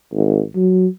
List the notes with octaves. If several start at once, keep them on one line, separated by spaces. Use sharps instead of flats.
G#1
F#3